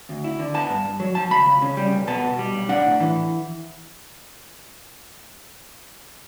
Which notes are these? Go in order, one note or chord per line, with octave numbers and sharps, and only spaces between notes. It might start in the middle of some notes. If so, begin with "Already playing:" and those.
D2
E4
D3
B3 A5
G2
G2
F#3
F#3 A5
C#2 B5
C#2
C#3
G3
B1
B3 A5
B2
G3
B1
D4 F#5
A2
E3